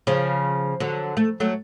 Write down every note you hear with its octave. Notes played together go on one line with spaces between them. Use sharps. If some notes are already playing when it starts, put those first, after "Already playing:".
C#3 F3
D3 F#3
A3
F#3 A3